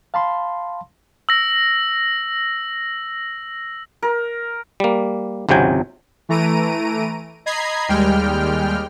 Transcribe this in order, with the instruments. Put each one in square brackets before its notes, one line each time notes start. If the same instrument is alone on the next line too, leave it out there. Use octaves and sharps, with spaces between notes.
[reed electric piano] F5 A5 B5 C6
[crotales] E6 A#6
[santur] A#4
[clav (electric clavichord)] G3 A#3
G#1 C#2 C3 F#3 G5 G#5
[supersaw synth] E3 A3 A#5 D7 D#7
D#5 A#5 B5 G#6 C7
D#2 G3 G#3 G5 F6